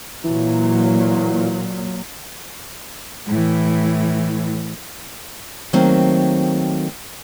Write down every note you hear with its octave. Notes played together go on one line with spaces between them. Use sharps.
A#2 E3 F#3
A2 E3
D#3 F#3 A3 A#3 C4